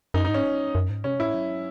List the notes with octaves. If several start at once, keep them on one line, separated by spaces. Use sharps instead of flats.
F#2 D#4
D#4
G#2
C#4
F#2
G#2
C3 C#4
A2 E4
F#3